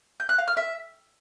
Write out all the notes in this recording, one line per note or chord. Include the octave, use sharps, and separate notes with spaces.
G6
F#6
F5
F6
E5